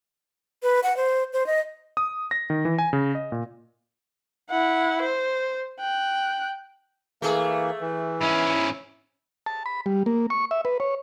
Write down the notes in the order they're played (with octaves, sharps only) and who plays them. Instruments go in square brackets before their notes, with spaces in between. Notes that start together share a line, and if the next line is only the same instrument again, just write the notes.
[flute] B4
F#5
C5
C5
D#5
[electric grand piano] D#6
A#6
D#3
E3
G#5
C#3
D#5
A#2
[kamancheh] E4 F#5
C5
G5 F#6
[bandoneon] E3 A#3 [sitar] A3 G#4
[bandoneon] E3
[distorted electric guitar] G#2 C#4 [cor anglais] E4
[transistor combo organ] A5
B5
G3
A#3
C#6
E5
B4
C#5